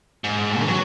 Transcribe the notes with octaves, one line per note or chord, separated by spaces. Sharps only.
G#2
E3
F#3